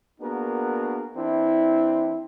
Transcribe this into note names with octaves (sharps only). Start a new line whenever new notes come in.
A#3 B3 D4 F#4 G#4 A#4
E3 C4 D4 E4